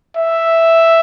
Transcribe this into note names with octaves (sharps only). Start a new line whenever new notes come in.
E5